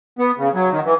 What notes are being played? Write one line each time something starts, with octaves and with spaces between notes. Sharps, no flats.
B3
C#3
F#3
D#3
E3